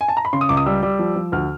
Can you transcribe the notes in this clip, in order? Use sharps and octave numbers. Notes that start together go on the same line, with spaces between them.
G#5
A5
A#5
B5
C#3 C6
D#6
C#2 D6
D#6
G3 E6
G3
F3
F3
D2 F6